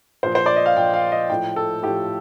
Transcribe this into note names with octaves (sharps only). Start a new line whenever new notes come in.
A#2 F3 C5
C5
D5
D#5
F5
A#2 F3 G5
F5
D#5
A2 F3 G5
A4
A2 F3 G4